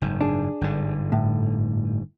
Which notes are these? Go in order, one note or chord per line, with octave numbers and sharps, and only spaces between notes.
F#1 G#2
D4 G#4
G1 G#2 D3
A2